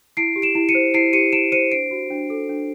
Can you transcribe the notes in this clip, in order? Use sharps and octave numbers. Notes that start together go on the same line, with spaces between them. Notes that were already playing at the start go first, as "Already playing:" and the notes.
E4 C7 D7
G4
D7 E7
E4
C#7 D#7
C5
E4 C7 D7
G4 C#7 D#7
E4 D7 E7
C5 C#7 D#7
D4 C7 D7
F#4
D4
A4
D4